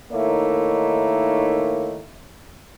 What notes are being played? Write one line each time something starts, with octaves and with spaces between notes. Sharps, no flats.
D#3 A3 A#3 D#4 E4 C#5